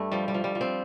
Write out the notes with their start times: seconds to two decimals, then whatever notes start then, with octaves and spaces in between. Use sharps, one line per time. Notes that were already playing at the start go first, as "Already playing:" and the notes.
Already playing: G2 A3 D4
0.12 F3 G3
0.28 G3
0.34 F3
0.44 G3
0.55 F3
0.61 C4